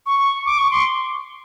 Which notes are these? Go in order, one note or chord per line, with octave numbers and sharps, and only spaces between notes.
C#6
D6
C#6
C6